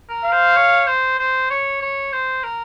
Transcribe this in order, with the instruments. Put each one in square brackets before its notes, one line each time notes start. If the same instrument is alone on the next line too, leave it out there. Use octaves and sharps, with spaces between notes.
[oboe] A#4
[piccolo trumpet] F5
[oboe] C5
C#5
C5
C5
C#5
C#5
C5
A#4